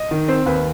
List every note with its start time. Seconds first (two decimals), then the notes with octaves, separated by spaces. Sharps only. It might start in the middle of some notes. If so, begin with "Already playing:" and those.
Already playing: D#5
0.11 D#3
0.28 C4 C5
0.46 D#2 B4